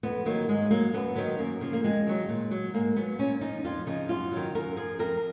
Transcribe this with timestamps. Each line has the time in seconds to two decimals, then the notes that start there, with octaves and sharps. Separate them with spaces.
0.03 F2 B3
0.26 D#3 F#3 A#3
0.48 G#2 G#3
0.71 F#3 A#3
0.94 F#2 B3
1.15 D#3 F#3 B3
1.39 F#2 A#3
1.61 C#3 F3
1.73 A#3
1.84 F2 G#3
2.07 D#3 F#3
2.29 A#2
2.51 F#3
2.74 G#2 A#3
2.96 F#3 B3
3.19 A#2 C#4
3.41 F3 D#4
3.64 F2 F4
3.87 C#3 F3 D#4
4.09 F#2 F4
4.31 D#3 F#3
4.55 F#2 A#4
4.77 F3 G#4
4.99 F2 A#4